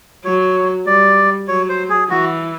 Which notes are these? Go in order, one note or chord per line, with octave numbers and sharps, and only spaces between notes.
F#3 C#5
G3 D5
F#3 C#5
C5
G#4
E3 F#4